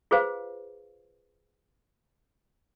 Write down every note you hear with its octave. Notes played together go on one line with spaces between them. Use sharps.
F4 G#4 B4 C5 F5